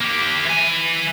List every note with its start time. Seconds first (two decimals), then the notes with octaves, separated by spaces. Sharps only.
0.01 A#3 G4
0.45 E3 G#5